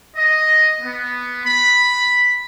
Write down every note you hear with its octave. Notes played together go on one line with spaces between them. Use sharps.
D#5
B3
B5